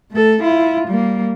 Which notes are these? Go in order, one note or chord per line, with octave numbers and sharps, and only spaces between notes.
A3 A4
E4 F4
G3 A#3